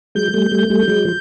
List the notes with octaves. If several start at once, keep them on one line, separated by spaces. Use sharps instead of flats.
F#3 G#3 G6
G3 A3
G3 A3
G3 A3
F#3 G#3
F3